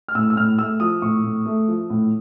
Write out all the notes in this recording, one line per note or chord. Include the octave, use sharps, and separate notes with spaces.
F6
A2 E6
E6
A2 F6
A3 E6
F3 D#6
A2 C#6
A2
A3
F3
A2